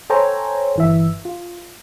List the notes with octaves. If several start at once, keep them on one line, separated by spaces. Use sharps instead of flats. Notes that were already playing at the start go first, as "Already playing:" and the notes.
A4 C5 C#5 G5 G#5 A#5
G1 E3 E5
F4